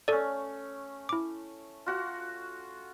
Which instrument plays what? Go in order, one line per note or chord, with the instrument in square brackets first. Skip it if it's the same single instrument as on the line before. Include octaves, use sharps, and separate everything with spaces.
[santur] A3 C#4 [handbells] A4 D5
[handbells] E4 D6
[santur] F4 F#4 F#5